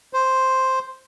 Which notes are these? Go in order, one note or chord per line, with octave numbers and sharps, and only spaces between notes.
C5